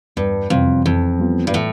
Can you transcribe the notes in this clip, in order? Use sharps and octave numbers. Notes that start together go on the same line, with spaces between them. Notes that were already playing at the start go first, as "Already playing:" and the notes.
E2 G2
F2 C3 E3 G3 C4
F2 E3
G3 B3 F4
G2
A2 E3